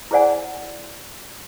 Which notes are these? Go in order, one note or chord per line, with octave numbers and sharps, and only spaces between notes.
E4 G#4 C5 D5 F#5 G#5